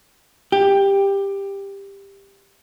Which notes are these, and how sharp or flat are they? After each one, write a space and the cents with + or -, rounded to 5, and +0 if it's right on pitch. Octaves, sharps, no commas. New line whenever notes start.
G4 +15